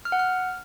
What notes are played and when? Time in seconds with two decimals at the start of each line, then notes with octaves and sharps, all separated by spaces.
0.05 F6
0.12 F#5
0.19 F6